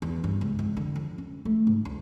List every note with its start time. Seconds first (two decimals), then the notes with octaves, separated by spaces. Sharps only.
0.02 E2
0.24 G2
0.41 C#2
0.59 F2
0.77 D3
0.96 F2
1.18 C#4
1.45 A3
1.67 G#2
1.85 D2